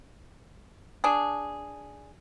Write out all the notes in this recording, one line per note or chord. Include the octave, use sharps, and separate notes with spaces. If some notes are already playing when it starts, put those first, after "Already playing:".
D4 G#4